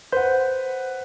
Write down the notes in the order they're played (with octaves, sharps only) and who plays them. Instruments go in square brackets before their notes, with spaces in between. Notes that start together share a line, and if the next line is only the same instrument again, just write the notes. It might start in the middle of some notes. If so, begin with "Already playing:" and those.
[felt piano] B4 F#5 [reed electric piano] C5 G6